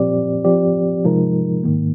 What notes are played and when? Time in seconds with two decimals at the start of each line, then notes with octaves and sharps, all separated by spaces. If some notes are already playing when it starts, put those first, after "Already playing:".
Already playing: A#2 F3 C4 G4 D5
0.45 F3 C4 G4 D5
1.05 C3 F3 G#3 D#4 A#4
1.64 G#2 D#3 A#3